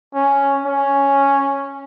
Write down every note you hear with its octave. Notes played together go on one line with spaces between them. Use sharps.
C#4
C#4